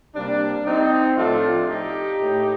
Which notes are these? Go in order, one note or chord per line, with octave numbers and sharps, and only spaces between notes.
C3 G3 A#3 D4
C4 D#4
A2 F3 A3 D4 F4
D#4 G4
A2 A3